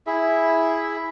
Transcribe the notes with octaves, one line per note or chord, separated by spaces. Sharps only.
E4 G#4 E5